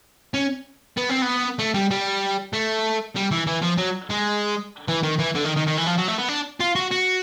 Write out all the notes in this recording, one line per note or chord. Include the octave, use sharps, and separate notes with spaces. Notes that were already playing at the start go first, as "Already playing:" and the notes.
C#4
B3
C4
B3
A3
G3
G3
A3
G3
E3
E3
F3
F#3
G#3
E3
D#3
E3
D3
D#3
D#3
D#3
E3
F3
F#3
A3
B3
D4
F4
F#4
F#4